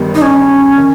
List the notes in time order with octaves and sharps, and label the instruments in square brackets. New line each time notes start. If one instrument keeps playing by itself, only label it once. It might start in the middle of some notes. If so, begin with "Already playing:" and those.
Already playing: [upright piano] G1 G2 D#3 G3 B3
[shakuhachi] D#4
C#4
[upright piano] D#3